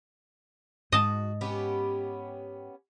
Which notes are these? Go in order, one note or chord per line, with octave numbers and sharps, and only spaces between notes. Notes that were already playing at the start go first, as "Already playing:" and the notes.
G#2 F#4 D#5 A5
B3 C#4 G4